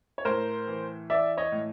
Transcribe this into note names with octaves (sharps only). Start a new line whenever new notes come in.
C#5
A2 A#4 C5
E3
E3 D5 E5
C#5 D#5
A2